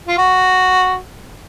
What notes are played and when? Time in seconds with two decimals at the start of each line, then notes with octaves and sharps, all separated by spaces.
0.08 F4
0.18 F#4